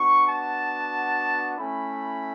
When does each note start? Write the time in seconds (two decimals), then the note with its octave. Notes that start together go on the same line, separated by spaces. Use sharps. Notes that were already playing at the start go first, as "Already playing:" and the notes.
Already playing: B3 D4 F#4 C#6
0.25 A5
1.57 A3 C#4 E4 B5